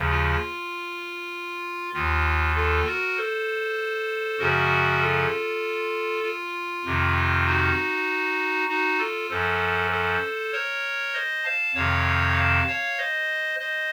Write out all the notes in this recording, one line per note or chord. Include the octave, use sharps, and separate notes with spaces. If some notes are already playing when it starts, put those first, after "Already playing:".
Already playing: D#2 C#3 F3
F4
D#2 D#3 F4
F4 A4
F#4 A#4
A4 C5
F#2 C#3 F3 F#4 A#4
F4 A4
F4
F2 C3 D#3
D#4 F#4
D#4 F#4
F4 A4
F#2 F3 A4 C5
A4 C5
A#4 C#5
C5 D#5
F5 A5
F2 C3 D#3 C#5 F5
F5 A5
C#5 F5
C5 D#5
C5 D#5